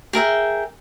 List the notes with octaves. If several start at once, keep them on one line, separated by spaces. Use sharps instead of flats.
G#4 A#4 E5 G5